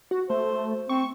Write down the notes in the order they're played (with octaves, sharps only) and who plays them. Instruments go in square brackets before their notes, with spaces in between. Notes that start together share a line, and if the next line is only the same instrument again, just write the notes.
[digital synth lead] F#4
[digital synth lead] A3 [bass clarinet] C5
[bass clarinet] C4 [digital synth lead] C#6